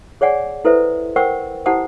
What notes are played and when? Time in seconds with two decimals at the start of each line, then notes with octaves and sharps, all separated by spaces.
0.21 G#4 C#5 D5 F#5 G#5
0.65 E4 A4 B4 C5 E5
1.16 A#4 C5 F#5 G5 C#6 E6
1.66 E4 G4 C5 F#5 A5 D#6